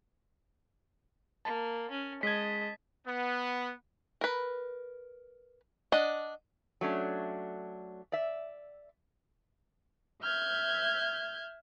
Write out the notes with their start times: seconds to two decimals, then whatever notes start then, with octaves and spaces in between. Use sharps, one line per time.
1.45 A#3 A5
1.91 C#4
2.23 G#3 D#5 A5 G#6 B6
3.07 B3
4.21 A#4 B4
5.92 D4 D#5 F#5
6.81 F#3 A3 C#4 D4
8.12 D5 E5
10.22 E5 F6 G6 G#6